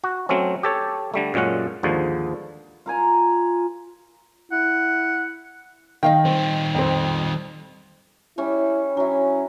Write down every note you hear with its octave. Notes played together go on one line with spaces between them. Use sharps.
F#4
F#3 A3 C4 C#4
G4 A4 C#5
D3 G3 A3
F#2 A#2 G#3 C#4 F#5
D#2 G#2 D3 F3
F4 A#4 G#5 A#5
E4 F#5
D#3 D#5 F5 G5
D#3 G3 C4
F2 C4
G3 C#4 E4
F#3 C#4 E4